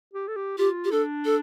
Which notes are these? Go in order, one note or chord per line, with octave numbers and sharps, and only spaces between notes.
G4
A4
G4
F4 G4
G4
D4 A4
A4